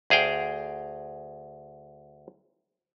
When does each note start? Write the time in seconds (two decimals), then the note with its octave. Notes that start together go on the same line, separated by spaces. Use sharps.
0.10 D2 G#4 F5 G5